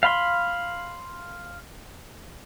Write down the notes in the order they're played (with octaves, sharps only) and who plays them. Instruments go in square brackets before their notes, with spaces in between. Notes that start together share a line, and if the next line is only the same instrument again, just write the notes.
[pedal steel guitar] F5 B5 C6